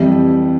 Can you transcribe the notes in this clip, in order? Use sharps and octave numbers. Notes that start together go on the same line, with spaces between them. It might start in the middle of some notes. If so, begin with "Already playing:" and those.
Already playing: F2 E3 G3